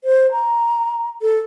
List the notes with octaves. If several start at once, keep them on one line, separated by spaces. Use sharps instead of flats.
C5
A#5
A4